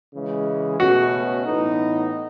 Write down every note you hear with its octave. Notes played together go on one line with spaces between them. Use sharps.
C#3 E3 G#3
B2 A3 C#4 F#4
A2 E3 B3 D#4